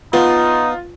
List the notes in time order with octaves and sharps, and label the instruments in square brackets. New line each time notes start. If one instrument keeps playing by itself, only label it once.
[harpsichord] B3 [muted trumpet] D#4 [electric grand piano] F4